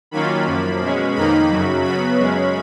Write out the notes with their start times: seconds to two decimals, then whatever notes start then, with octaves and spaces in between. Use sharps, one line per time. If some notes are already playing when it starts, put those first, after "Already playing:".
0.11 D#3 F#3 A#3 C#4 F4 B5
0.47 F#2 F3 A#3
0.80 B2 G#3 C#4
1.15 F2 D#3 A#3 D#4 B5
1.49 F#2 C#3 F#3
1.84 C#3 F#3 B3 B5
2.18 F#2 C#3 G#3 C#4